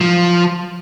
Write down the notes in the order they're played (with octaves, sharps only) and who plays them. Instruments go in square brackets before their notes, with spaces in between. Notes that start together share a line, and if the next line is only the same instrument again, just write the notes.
[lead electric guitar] F3